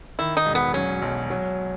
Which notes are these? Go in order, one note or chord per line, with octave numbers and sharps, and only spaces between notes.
D#3 E4
D#4
E1
B3
F#3 C#4
B1
F#3